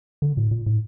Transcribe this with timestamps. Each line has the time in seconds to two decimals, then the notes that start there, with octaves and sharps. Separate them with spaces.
0.22 D3
0.37 A2
0.51 A#2
0.66 A2